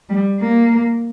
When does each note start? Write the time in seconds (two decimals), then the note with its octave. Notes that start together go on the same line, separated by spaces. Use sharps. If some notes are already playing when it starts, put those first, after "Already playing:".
0.09 G3
0.40 A#3